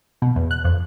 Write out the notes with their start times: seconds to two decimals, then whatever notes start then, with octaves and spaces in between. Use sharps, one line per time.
0.22 B2
0.36 E2
0.51 F#6
0.65 F2